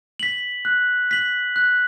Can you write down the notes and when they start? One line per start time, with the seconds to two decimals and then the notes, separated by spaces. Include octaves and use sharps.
0.20 B6 F#7
0.65 F#6
1.11 B6 F#7
1.56 F#6